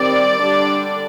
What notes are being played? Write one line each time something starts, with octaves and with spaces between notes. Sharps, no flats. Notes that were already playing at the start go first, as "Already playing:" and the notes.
Already playing: D#3 G3 C4 D5
D3 G3 D4